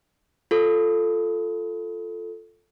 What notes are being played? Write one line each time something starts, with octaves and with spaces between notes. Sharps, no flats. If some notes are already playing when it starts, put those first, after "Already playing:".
F4 A4